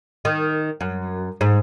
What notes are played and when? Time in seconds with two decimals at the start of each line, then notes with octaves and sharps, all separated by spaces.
0.25 D#3
0.81 F#2
1.41 G#2